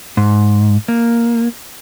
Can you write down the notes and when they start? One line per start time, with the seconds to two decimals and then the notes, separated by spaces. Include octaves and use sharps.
0.17 G#2
0.88 A#3